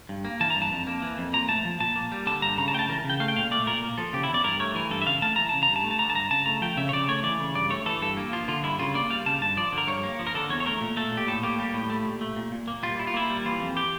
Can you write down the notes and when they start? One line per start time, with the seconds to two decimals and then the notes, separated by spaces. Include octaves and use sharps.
0.09 G2
0.25 A#3
0.40 E3 A5
0.50 A#5
0.56 G2
0.62 A5
0.72 F2
0.87 A#3
1.02 E3
1.18 F2
1.33 A#2 A#5
1.49 A3 A5
1.65 F3
1.80 A#2 A5
1.96 A#3
2.12 G3
2.26 D3 A5
2.42 G2 A#5
2.58 C#3 A#5
2.68 A5
2.73 A3 G5
2.79 A5
2.89 E3 A#4
3.05 C#3 G5
3.20 A3 F5
3.28 G5
3.36 A#2 F5
3.51 A3 D5
3.67 A#2 A#4
3.83 A#3
3.98 F3 A4
4.13 C#3 G4
4.23 E4
4.29 E2
4.34 D5
4.44 G2 A#4
4.60 A3 C#5
4.75 E3 A#4
4.90 G2 A4
5.01 E5
5.06 C#3 F5
5.22 A3 A5
5.36 E3 A#5
5.49 C#3 A5
5.63 A#5
5.68 G2
5.76 A5
5.84 A3
5.91 A5
5.99 D3 A#5
6.10 A5
6.15 G2 A#5
6.30 C#3 A5
6.46 A3 A#5
6.62 F3 G5
6.77 C#3 E5
6.89 C#5
6.93 C#3 D5
7.08 A3 C#5
7.23 E3 D5
7.40 C#3
7.55 G2 D5
7.70 A3 C#5
7.86 E3 A4
8.01 G2 A4
8.17 A#3
8.32 F3 F4
8.48 D3 F4
8.63 G2 E4
8.79 C#3 F4
8.94 A#3 D5
9.10 G3 F5
9.26 C#3 A5
9.41 G2 A5
9.57 F3 D5
9.73 D3
9.78 A#4
9.88 G2 C#5
10.03 A#3
10.19 F3
10.27 A#4
10.34 D3 A4
10.49 E2 C#5
10.60 C#5
10.66 A3 A#4
10.81 A#2
10.97 A3 A4
11.12 A#2
11.17 G4
11.27 A2 A4
11.43 A#3 G4
11.59 G3 G4
11.74 A2
11.90 A3
12.05 A#2
12.21 A3
12.36 A#2
12.52 A#2
12.68 A#3
12.83 G3 F4
12.98 A#2 E4
13.07 F4
13.14 A#3 E4
13.30 G3
13.45 E3 F4
13.60 F2
13.77 G4